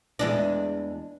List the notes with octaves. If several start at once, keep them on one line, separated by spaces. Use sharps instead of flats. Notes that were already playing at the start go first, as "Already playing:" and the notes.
E2 G#3 D4